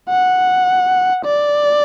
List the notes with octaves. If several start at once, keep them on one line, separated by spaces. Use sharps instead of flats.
F#5
D5